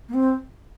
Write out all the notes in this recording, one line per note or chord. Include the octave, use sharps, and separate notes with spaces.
A#3
C4